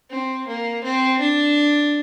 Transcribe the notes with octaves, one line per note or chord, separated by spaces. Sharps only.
C4
A#3
C4
D4